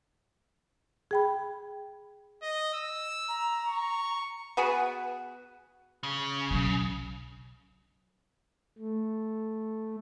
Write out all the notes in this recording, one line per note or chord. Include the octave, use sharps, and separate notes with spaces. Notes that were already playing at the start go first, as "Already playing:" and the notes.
G#4 G5 B5
D#5
E6
A#5
C#6
B3 F#4 G#4 B4
C#3
B1 F#3
A3